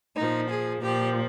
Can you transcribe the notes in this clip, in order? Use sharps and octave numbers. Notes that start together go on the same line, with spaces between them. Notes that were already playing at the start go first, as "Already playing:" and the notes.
A#2 F3 D#4
G#4
A#2 F3 G4